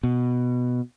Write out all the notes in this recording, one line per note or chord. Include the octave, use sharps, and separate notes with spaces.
B2